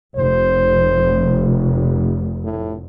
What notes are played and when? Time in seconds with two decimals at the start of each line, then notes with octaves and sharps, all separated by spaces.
0.17 F1 C5
2.44 A2